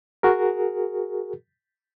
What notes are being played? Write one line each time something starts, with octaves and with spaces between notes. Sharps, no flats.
F#4 G#4 A#4